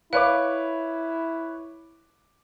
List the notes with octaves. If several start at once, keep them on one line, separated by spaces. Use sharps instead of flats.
E4 B4 C#5 F5 D6